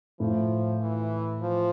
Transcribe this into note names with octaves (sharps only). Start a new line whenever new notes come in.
A2 F3
E3
F3